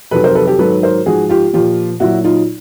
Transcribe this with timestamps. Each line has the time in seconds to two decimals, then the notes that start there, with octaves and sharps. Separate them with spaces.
0.11 F2 C3 D#3 F#3 A4 B4
0.24 A#4 C5
0.35 A4 B4
0.47 G4 A4
0.59 G#2 D#3 F#3 A4 B4
0.83 A#4 C5
1.06 G#2 F3 F#4 G#4
1.29 F4 G4
1.53 A#2 F3 F4 G4
2.00 A#2 F#3 E4 F#4
2.24 D#4 F4